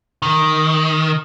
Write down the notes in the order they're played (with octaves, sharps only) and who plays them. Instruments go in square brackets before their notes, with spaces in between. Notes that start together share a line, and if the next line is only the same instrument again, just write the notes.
[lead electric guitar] D#3